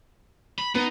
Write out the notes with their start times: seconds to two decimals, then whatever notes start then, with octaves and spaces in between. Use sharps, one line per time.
0.58 B5
0.75 B3 D#4